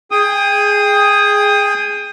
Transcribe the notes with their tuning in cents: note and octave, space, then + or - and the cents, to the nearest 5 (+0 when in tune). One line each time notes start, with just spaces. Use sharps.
G#4 +0 G5 +30 D#6 +0